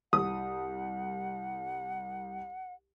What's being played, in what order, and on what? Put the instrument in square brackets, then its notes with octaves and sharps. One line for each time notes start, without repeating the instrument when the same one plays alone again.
[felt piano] C2 [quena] F#5 [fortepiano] D#6